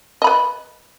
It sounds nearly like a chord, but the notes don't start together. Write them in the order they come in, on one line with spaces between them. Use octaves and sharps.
D#5 B5 B4